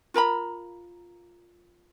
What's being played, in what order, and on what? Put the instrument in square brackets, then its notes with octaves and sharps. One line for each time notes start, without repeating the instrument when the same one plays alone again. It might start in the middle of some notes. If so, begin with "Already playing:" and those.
[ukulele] F4 A#4 A#5 B5